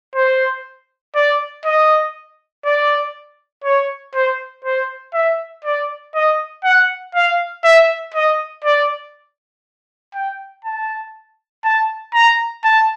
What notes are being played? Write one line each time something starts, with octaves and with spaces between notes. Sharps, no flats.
C5
D5
D#5
D5
C#5
C5
C5
E5
D5
D#5
F#5
F5
E5
D#5
D5
G5
A5
A5
A#5
A5